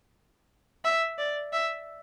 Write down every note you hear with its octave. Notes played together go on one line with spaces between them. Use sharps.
E5
D5
E5